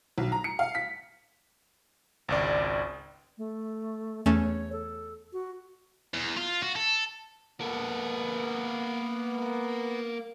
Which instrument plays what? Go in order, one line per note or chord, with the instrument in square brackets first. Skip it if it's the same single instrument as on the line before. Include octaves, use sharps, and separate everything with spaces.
[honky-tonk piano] B1
A#5
C#7
F5
B6
[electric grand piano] G#1 C#2 D5
[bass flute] A3
[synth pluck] E2 A3 C#4 [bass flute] C#5
[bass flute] A4
F#4
[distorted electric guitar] E2
F4
F#4
A4
[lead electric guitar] A#3 A4 [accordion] B3